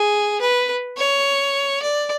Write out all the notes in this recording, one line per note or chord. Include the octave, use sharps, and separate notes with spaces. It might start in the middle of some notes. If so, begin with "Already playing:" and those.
Already playing: G#4
B4
C#5
D5